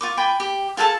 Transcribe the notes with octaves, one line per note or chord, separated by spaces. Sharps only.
F4 C#6 D6
G5 G#5 B5
G4
F4 G#4 A4 A5